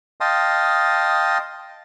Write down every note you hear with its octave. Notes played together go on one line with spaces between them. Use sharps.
D#5 F5 G5 A5 C6 D#6